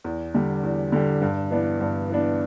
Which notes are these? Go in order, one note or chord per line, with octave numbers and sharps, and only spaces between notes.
E2
D3 G3
E2
D3 G3
G2
E3 B3 D4
G2
E3 B3 D4